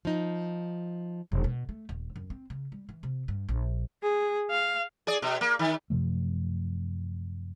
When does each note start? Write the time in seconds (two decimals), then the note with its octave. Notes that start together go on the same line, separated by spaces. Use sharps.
0.05 F3 D#4
1.32 E1
1.44 B2
1.69 A3
1.89 D#1
2.16 F#2
2.30 C4
2.50 C#3
2.72 G3
2.89 E3
3.03 C3
3.28 G2
3.49 A#1
4.03 G#4
4.50 F5
5.07 G#4 D5
5.22 B2
5.41 A#3
5.59 D#3
5.90 F#2 C3 F3 A3